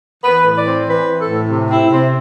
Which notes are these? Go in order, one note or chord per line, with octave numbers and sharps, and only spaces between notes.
E3 B4
A2
D5
C4
E3 B4
E3
A4
A2
C3
C4 E4
C3 C4